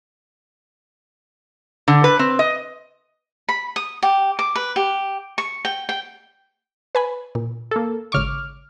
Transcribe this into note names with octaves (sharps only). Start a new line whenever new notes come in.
D3
B4
C4
D#5
B5
D#6
G4
D6
B4
G4
C#6
G5
G5
B4 G#5 B5
A#2
A#3 A4
G#1 C#3 C#6 D6 F6